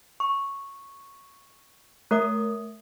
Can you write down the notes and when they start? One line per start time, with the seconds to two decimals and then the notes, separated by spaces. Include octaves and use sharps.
0.20 C#6
2.11 A3 A#4 E5 D#6